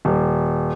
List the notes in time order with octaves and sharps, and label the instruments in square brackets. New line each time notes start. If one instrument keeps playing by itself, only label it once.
[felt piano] D#1